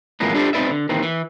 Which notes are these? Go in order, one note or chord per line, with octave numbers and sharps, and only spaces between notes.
F2 A2 E3 G#3 A#3 B3
D4 E4 G4 A4 C5
C4 D#4 F4 B4 D5 E5
D3
D#2 D#3 E3 C4
E3